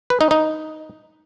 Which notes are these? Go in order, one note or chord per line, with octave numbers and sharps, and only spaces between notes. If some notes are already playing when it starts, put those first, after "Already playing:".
B4
D#4
D#4